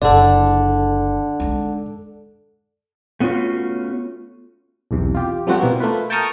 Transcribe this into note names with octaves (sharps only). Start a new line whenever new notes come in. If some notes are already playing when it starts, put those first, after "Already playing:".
F#1 D3 A4 D5
G#3 D#4
A3 B3 C#4 D#4 F4 F#4
B1 E2 C3
F4 G4
F3 G3 A3 C4 F#4
B2 E3 A#3 C4
A3 A#3 F4 B4
G5 A5 A#5 C#6 D#6 F6